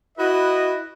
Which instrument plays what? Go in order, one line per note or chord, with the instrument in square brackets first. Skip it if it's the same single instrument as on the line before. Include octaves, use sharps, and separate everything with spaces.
[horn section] E4 F#4 B4 D#5